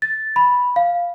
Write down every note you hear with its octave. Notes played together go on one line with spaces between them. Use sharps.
A6
B5
F5